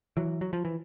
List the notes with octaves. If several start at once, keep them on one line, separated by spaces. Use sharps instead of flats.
E3 F#3
F#3
F3
E3